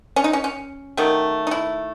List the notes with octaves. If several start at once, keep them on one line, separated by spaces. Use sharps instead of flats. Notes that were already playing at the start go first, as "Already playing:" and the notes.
C#4
D#4
C#4
C#4
D#3 F#3 A3
D#4
E4